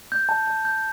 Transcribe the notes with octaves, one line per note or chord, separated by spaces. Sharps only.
G6
A5
A5
G6